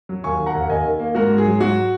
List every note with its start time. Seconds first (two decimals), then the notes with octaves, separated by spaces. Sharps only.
0.09 F#3
0.24 D#2 G#5 C#6
0.40 D#3
0.46 F#5 A#5
0.54 D#2
0.62 F#5
0.69 D#2 D#5 G#5
0.85 D#3
0.99 A#3
1.15 G#2 F#4 A#4
1.30 G#2
1.38 G#4
1.46 F#3
1.60 G#2 F#4